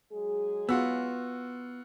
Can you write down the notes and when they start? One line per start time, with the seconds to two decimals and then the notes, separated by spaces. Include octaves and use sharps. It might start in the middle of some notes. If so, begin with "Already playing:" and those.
0.12 F#3 G#3 G#4
0.69 B3 F4 F#4 E6